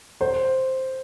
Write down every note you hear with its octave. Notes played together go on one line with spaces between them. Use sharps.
C5